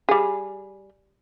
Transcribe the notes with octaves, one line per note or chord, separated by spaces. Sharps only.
G3 G#4